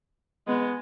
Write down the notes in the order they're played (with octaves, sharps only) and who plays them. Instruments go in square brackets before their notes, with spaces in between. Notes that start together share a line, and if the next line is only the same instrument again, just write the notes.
[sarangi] G#3 [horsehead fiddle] B3